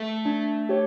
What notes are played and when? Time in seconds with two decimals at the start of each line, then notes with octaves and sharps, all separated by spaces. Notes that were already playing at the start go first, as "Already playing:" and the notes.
Already playing: A3
0.25 D4
0.69 G4 C#5